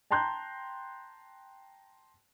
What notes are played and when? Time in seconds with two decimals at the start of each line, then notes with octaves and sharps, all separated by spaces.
0.11 G5 A5 A#5 C6 F#6 G6